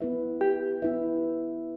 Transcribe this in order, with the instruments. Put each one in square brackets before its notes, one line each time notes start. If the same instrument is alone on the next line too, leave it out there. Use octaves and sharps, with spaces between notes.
[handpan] B3 E4 B4 E5
[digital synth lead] G4
[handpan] B3 E4 B4 E5